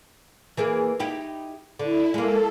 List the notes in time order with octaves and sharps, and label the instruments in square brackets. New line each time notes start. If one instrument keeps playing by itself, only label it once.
[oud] E3 A#3 G#4
D#4 E4 G4
[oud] D3 [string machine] E4
[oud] G#3 A#3 [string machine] A4